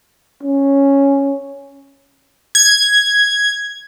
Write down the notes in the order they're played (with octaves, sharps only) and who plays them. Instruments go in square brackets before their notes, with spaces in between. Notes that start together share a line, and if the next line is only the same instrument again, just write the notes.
[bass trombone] C#4
[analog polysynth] G#6